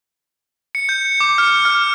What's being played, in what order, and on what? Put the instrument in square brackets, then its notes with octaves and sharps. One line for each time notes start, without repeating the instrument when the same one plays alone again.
[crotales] C#7
G6
D6
F6
F6